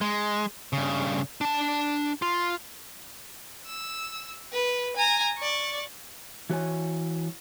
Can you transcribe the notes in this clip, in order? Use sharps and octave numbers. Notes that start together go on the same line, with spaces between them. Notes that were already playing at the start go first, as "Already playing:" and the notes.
G#3
G2 C#3
D4 A5
F4
E6
B4
G#5 A#5
D5 C#6
E3 F#4 C#5 G#5